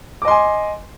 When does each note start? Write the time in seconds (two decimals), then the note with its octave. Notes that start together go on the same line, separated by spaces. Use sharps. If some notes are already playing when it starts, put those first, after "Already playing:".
0.22 D6
0.25 D#5
0.28 C6
0.31 G#5